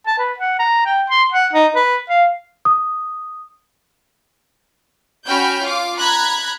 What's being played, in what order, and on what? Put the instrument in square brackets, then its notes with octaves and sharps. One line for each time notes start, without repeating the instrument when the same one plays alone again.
[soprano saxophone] A5
B4
F#5
A#5
G5
C6
F#5
D#4
B4
F5
[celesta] D#6
[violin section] C#4 F#4 G5 B5 F6 G6
F4 F5 D6
A#5 B5 F#6 G#6